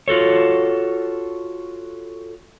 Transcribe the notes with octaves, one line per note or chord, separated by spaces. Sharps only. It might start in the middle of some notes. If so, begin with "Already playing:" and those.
F4 F#4 A4 C#5